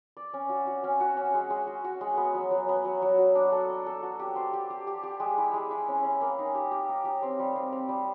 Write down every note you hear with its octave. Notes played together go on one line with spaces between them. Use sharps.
D5
C#4
F#4
F#4
C#4
F#4
C#4
G#3
G#3
F#4
F#4
G#3
B3
F#3
F#3
B3
F#3
F#3
F#4
D4
A4
D4
A4
F#4
G4
C5
G4
G4
G4
G4
G#3
E4
G#3
E4
C#4
C#4
A#3
D#4
G4
G4
D#4
G4
C4
G3
C4
C4
G3